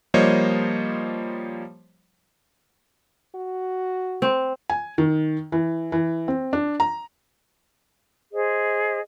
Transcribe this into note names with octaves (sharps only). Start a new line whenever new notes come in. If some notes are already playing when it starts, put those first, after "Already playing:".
F3 G3 A#3 C5 C#5 D#5
F#4
C4
G#5
D#3
E3
E3
C4
D4
A#5
G#4 C5 D#5